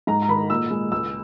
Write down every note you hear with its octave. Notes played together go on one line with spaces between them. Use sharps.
G#2 A#5
A#5
D#3 B5
A#2 E6
G#3
C#2 E6